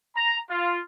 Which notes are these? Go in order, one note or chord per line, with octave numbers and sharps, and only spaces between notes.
A#5
F4